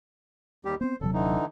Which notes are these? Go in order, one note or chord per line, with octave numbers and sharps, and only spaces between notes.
D#2 G3 G4
B3 C4 C5
D#1 C3 F#3 A4
D3 E3 D#4